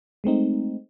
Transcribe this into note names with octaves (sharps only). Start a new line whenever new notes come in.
G#3 A3 C4 D#4